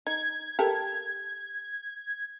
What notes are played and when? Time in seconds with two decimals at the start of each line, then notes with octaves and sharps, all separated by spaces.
0.07 D#4 G#6
0.59 G4 A4 A#4